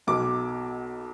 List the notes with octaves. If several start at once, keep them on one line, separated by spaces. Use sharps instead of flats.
B1 B2 F#3 D6